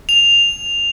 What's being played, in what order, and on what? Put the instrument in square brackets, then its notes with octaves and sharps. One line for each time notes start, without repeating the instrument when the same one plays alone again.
[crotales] F7